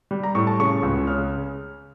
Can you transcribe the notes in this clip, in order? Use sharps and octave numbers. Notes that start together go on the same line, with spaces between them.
G3
A#5
A2 C#6
A5
C#3 C#6
C#2
C#3 F6